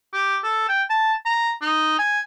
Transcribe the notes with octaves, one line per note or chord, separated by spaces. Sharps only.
G4
A4
G5
A5
A#5
D#4
G#5